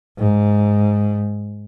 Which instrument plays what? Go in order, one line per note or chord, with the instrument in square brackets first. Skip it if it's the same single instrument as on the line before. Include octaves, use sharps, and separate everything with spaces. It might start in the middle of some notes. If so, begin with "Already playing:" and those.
[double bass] G#2